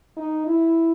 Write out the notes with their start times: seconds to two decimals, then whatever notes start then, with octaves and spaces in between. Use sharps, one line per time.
0.17 D#4
0.47 E4